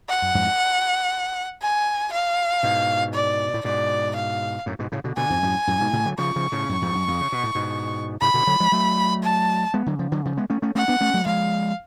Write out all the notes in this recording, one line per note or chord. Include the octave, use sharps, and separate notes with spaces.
F#5
F#2
F2 G#2
G#5
F5
G#2 B2
D5
A2
G#2 B2 D5
F5
F#2 A2
G#2 B2
A2 C#3
B2 D3
B2 D3 G#5
F2 G#2
F#2 A2
F#2 A2
G#2 B2
A2 C#3
D3 F#3
C#3 F3 C#6
C#3 F3
A2 C#3
F#2 A2
F2 G#2
F#2
F2
C#3
B2
A2
G#2 B2
A2 C#3 B5
B2 D3
D3 F#3
F3 G#3
F#3 A3
A5
G#3 B3
D3 F#3
C#3 F3
D3 F#3
C#3 F3
G#3 B3
A3 C#4
A3 C#4
A3 C#4 F#5
B3 D4
A3 C#4
F#3 A3
F3 G#3 F5